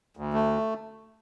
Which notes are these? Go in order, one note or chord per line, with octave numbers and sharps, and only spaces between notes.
D2
A3